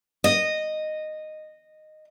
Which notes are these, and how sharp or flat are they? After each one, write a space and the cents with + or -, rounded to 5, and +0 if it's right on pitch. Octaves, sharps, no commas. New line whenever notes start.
D#5 -10